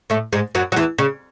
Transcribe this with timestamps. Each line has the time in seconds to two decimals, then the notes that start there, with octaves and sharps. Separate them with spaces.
0.10 A2 A3
0.33 G#2 G#3
0.55 F#2 F#3
0.72 F#3
0.76 E2 E3
0.98 C#3